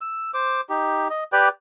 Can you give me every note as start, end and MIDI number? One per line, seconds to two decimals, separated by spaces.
0.01 0.31 88
0.34 0.61 72
0.34 0.61 86
0.69 1.08 63
0.69 1.08 67
1.10 1.24 75
1.32 1.49 67
1.32 1.49 71
1.32 1.49 74
1.32 1.49 79